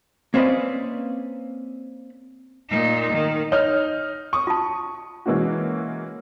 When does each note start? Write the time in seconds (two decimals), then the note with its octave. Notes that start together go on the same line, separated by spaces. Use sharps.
0.34 A#3 C4 C#4 B4 D5 D#5
2.70 A#2 D#4
3.13 D#3
3.52 D#4 C#5 F6
4.33 C#6 D#6
4.47 F4 A5
5.26 E3 G#3 A#3 C#4 F#4